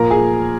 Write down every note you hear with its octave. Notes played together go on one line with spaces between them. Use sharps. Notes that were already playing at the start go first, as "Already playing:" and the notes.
Already playing: A#2 F3 A#4 A#5
G#4 G#5